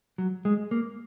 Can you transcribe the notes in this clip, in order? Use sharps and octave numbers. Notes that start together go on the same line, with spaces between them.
F#3
G#3
A#3